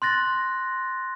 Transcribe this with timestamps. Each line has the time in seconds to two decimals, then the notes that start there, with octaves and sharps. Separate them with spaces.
0.02 C6 F#6 A6 A#6